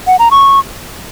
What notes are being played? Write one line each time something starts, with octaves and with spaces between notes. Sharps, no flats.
F#5
A#5
C#6